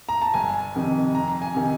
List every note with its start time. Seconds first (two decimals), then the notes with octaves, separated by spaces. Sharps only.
0.09 A#5
0.22 A5
0.34 G1 G#5
0.75 F2 C3 D#3
1.15 F2 A#5
1.42 G#5
1.54 C3 D#3